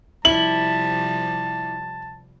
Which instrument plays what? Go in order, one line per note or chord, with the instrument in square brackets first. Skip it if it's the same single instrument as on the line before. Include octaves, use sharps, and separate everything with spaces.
[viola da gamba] C3 F3 G3 [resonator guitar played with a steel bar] E4 [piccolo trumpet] A5 [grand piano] F#7